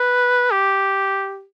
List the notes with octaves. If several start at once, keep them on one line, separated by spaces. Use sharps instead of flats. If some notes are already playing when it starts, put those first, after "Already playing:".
Already playing: B4
G4